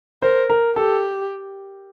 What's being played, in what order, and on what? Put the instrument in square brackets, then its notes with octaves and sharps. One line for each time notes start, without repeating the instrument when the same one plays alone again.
[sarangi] A#4 [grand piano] C5
[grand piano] A#4
[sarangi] G4 [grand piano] A4